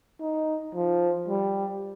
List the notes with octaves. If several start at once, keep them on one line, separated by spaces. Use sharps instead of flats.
D#4
F3
G3